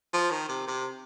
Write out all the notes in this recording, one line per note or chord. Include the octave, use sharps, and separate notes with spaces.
F3
D#3
C3
C3